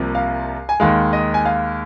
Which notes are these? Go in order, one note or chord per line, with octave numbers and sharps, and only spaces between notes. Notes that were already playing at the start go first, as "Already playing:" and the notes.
Already playing: C2 C3 F3 A#3
F5
G#5
D#2 D#3 G#3 F5
D#5
G#5
F5